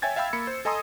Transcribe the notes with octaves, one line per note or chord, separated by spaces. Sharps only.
C#5 E5 G5 G#5 G#6 A6
E5 F5 G5 B5 E6
A#3 B5 C#7
C5
A4 D#5 G#5 A#5 C6 D#6